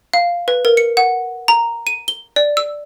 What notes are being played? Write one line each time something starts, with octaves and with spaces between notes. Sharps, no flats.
F5
B4
A#4
C#7
F#5
A#5
D#7
G7
D5
E6